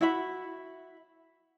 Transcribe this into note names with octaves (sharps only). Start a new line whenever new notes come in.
E4 F#4 E5 B5